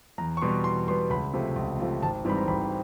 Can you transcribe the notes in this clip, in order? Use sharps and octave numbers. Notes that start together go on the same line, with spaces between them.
E2 A#5
C#6
B2 G3 B3 C6
E2 C6
B2 G3 B3 C6
C#2 B5
C3 F3 A3
C#2
C3 F3 A3
G#1 A5
G#2 E3 G3 C4 B5
A#5
G#1 B5